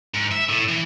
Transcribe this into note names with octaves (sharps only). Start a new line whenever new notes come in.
G#2
E5
A2
E3